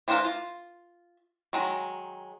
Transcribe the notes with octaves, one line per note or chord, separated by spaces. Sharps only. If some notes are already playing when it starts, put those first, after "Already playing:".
E3 D4 C5 F5 A#5
F4
D#3 F#3 G#3